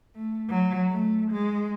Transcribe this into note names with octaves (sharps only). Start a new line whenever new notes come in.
A3
F#3
A3
G#3